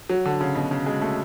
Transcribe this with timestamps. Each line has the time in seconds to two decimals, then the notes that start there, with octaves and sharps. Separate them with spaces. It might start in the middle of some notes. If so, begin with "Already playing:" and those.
0.10 F#3
0.26 D3
0.41 C#3
0.56 B2
0.71 C#3
0.86 G#3
1.01 A3